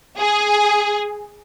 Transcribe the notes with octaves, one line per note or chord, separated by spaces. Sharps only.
G#4